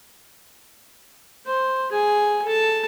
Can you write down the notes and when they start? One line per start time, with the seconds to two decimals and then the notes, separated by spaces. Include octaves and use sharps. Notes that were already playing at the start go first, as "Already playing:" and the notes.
1.47 C5
1.91 G#4 G#5
2.45 A4 A5